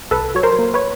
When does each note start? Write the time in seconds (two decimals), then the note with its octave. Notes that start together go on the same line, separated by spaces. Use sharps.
0.11 C2 A4 B4
0.35 F#3 C#5
0.43 A#4 C5
0.59 A#3
0.74 B4 C#5